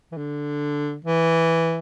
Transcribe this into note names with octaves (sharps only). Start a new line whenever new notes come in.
E3
D3
E3